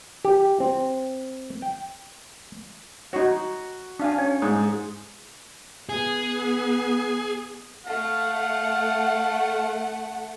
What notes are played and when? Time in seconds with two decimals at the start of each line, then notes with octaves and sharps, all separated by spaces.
0.25 G4
0.60 C4
1.62 G5
3.13 D#4 F#4 C#5
4.00 D4 F5 G#5
4.18 C#4 C#5
4.42 G#2 G#4
5.89 B3 G#4
7.86 A3 F5 F#5